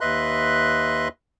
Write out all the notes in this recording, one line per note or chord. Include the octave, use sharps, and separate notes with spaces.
D#2 B4 D#5 E5 C6 F#6